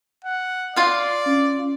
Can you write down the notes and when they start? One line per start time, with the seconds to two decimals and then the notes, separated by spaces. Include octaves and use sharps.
0.25 F#5
0.76 F4 D5 F5
1.26 C#4